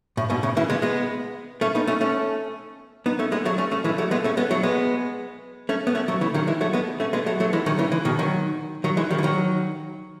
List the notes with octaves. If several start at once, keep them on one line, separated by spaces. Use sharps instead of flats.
A2
G#2 B2
A2 C#3
C#3 E3
G#3 B3
G#3 B3
A3 C#4
B3 D#4
A3 C#4
A3 C#4
B3 D#4
A3 C#4
G#3 B3
F#3 A3
A3 C#4
A3 C#4
E3 G#3
F#3 A3
G#3 B3
A3 C#4
G#3 B3
F#3 A3
G#3 B3
A3 C#4
B3
A3 C#4
F#3 A3
C#3 E3
D#3 F#3
E3 G#3
F#3 A3
G#3 B3
A3 C#4
G#3 B3
F#3 A3
F#3 A3
E3 G#3
D#3 F#3
C#3 E3
E3 G#3
B2 D#3
D#3 F#3
D#3 F#3
E3 G#3
D#3 F#3
E3
D#3 F#3